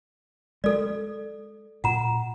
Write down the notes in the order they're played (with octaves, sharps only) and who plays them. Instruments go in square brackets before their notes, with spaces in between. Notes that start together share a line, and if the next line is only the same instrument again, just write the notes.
[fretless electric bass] G#3 [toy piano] A4 D5
[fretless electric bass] A#2 [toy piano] F#5 A#5